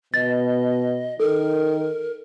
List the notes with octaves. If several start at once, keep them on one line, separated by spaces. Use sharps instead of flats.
B2 D#5 A6
D#3 A4 A#4